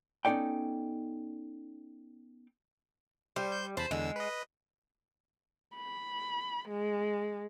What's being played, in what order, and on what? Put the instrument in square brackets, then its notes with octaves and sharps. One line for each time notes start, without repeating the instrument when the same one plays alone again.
[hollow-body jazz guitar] B3 C#4 D#4 A4 D5 G5
[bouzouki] G3 [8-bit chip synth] C5
[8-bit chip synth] C5 G6
[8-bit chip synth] E2 A5 B5 [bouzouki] C5
[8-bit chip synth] E2 D3 E6 [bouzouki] G#3
[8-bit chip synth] B4 D#5
[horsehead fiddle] B5
G#3